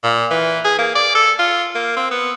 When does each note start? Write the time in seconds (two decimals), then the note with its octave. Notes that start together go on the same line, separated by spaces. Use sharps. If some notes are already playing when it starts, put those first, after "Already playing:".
0.04 A#2
0.31 E3
0.65 G#4
0.78 A#3
0.95 D5
1.15 A4
1.39 F4
1.75 A#3
1.97 C4
2.11 B3